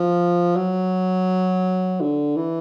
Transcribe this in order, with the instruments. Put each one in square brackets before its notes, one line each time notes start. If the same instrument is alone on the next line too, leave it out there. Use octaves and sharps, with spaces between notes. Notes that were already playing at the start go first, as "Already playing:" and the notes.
Already playing: [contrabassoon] F3
F#3
D3
E3